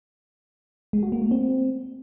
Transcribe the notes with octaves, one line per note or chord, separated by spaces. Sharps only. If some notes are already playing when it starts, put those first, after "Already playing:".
G#3
F#4
A#3
A3
C4